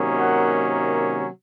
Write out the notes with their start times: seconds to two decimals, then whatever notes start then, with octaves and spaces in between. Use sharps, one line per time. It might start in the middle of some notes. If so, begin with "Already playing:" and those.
Already playing: C3 D#3 F#3 A#3 C#4
0.19 F#5